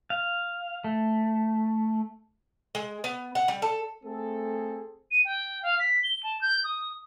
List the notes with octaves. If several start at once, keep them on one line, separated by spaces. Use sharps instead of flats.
F5
A3
G#3
B3
F#5
G3
A4
A3 C4 G#4 A4
D#7
G5
F5
B6
G7
A5
G6
D#6